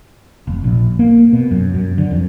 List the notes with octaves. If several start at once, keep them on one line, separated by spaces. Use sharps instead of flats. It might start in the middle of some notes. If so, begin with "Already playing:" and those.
F1
A#1
A#3
B2
F#2
F#2
D3
F2